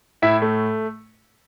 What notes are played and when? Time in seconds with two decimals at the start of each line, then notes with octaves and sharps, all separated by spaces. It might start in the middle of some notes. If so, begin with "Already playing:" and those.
0.22 A2 E4 E5
0.42 A3